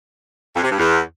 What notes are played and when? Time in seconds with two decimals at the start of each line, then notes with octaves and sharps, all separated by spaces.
0.56 F2
0.64 C3
0.71 G2
0.79 E2